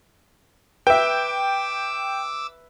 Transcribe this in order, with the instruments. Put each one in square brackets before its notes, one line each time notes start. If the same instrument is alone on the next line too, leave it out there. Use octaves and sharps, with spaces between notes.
[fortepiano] B4 E5 [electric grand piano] G5 [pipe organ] D6 E6